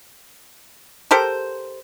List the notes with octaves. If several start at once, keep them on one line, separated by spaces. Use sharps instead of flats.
G4 A4 A#4 C5